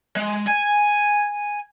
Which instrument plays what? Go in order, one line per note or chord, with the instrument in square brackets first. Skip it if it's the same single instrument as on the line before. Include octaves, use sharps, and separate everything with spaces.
[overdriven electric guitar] G#3
G#5